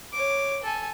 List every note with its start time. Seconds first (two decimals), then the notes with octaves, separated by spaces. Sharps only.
0.12 C#5 D6
0.63 A4 G#5